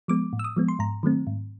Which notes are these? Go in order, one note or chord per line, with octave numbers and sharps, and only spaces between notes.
F3 G#3 B3 D6
A2
E6
D#6
F3 G#3 B3
C6
G#2 A#5
D#3 F#3 A3 C4
G#2